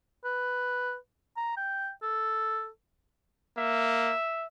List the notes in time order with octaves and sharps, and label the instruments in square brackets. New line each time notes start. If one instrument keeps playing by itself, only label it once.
[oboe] B4
A#5
G5
A4
[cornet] A#3 [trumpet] E5